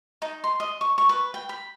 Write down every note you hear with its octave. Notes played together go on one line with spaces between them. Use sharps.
D#4
C6
D#5
C#6
C#6
B4
G5
B5